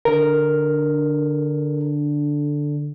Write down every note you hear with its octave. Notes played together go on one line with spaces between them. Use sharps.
D3 A#4